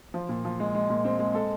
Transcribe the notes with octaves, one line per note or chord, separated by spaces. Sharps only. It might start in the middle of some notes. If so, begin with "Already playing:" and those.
F3
A#2
F3
G#3
G#3
A#2
C4
G#3
A4